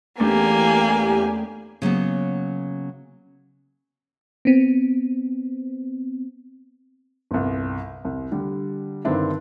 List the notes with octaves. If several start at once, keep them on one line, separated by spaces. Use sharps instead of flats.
E2 A3 A#3 C#4 D4 G4 G#5
C#3 F#3 A#3 B3
B3 C4
G1 C2
C2
D3 G3
G2 D3 D#3 C4 D4 E4